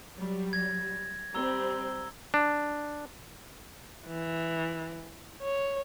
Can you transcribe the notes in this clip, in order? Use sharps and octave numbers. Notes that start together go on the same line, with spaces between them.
F#3 G3
G#6 A#6
G3 C4 A#5 E6 G7
D4
E3
C#5